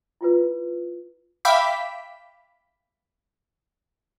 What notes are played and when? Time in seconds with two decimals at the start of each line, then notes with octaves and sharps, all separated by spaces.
0.21 E4 F4 B4
1.45 E5 F5 G5 B5 D6 B6